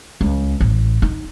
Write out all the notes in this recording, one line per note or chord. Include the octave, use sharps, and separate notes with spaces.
C#2
A1
D#4